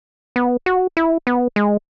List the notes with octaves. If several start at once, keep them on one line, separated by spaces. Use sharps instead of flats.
B3
F#4
E4
B3
G#3